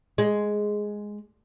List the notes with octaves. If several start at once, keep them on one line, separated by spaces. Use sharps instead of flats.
G#3